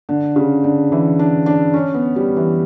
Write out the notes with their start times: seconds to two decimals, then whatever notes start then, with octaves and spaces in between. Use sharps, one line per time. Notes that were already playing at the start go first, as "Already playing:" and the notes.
0.09 D3
0.36 C#3
0.64 D3
0.92 E3
1.19 D4
1.46 D4
1.74 C#4
1.94 B3
2.16 G3
2.37 E3